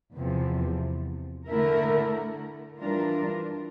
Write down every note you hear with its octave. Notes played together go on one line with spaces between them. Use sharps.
E2 C3 F3
D3 A3 E4 A#4
E3 G3 D4 F4 A#4